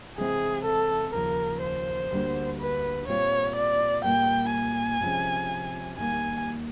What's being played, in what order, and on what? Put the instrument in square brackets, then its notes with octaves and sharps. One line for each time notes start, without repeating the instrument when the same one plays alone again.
[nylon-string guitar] C3 E3 G#3 C4 E4 [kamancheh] G#4
[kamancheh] A4
[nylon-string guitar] D#2 C#3 F3 [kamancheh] A#4
[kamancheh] C5
[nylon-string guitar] D2 D3 G3 A#3 D4
[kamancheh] B4
[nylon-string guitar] A#2 G3 C4 F4 [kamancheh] C#5
[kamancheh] D5
[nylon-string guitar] A#2 G3 A#3 [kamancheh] G5
[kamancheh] G#5
[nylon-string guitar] C3 F3 G#3 C#4
[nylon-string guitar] D#2 D#3 G3 A#3 [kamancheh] G#5